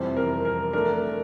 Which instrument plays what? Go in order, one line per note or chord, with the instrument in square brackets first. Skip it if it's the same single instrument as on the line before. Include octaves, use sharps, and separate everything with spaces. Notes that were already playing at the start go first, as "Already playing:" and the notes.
Already playing: [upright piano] F2 C3 E3 G3 C5
A#4
A#4
A3 D4 A#4